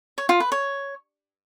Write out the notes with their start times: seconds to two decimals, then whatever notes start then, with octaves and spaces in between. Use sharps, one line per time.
0.18 C#5
0.29 F4
0.40 B4
0.52 C#5